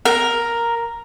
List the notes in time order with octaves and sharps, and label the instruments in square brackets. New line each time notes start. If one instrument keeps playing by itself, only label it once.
[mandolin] A#4